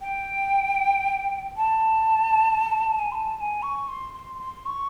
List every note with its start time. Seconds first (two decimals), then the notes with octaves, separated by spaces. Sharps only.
0.01 G5
1.57 A5
2.99 G#5
3.11 C6
3.15 A5
3.37 A5
3.41 G#5
3.62 C#6
3.89 C6
4.14 C6
4.40 C6
4.66 C#6